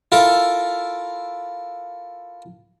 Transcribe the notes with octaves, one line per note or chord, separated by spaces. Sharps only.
E4 F4 A4 A#4